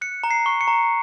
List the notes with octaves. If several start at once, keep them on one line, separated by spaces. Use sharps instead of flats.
F#6 C#7
A#5
C7
C#6
C#7
A#5